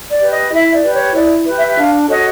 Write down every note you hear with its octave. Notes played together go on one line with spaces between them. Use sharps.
D5
G4 B4
D#5
E4 E5
D5
G4 B4
C#5
E4 D5
G4 B4
E5
D4 F5
F#4 A4 C#5 D#5